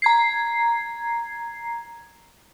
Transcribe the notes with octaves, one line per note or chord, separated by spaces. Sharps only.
A#5 G#6 C7